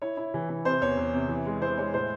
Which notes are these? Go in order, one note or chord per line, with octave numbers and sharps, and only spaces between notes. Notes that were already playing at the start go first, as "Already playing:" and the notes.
E4 C#5
E4
E3
E3
C3 C5
E2 C#5
E2
C3
E3
G#3
E3 C5
G#3 C#5
A2 C5